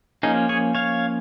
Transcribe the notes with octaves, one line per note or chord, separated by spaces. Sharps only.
F3 A#3 C#4 D#4 G#4
G#4 C#5
C#5 F5